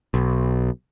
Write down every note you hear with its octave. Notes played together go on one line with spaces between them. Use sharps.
B1